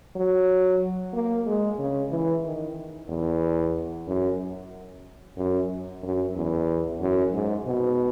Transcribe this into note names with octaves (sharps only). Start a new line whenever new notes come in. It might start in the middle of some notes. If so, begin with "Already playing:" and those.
F#3
A#3
G#3
C#3
E3
D#3
E2
F#2
F#2
F#2
E2
F#2
G#2
B2